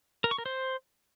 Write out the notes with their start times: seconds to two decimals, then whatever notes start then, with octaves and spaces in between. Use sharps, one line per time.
0.24 A#4
0.31 C#6
0.38 A#4
0.46 C5